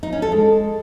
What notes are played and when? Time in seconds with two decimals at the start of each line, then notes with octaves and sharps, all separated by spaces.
0.03 D#4
0.13 C#4
0.22 A4
0.32 G#3